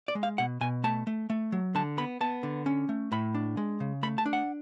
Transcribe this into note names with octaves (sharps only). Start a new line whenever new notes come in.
D5
G#3
F5
B2 F#5
B2 G#5
A3 A5
A3
A3
F#3
D3 A5
B3 B5
B3 A5
D3
C#4
A3
A2 B5
D4
G#3
C#3
A3 B5
A5
D4
F#5